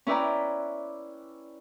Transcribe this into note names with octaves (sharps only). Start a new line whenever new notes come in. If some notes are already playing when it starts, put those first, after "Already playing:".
C#4 E4 B4 D5 G5 A#5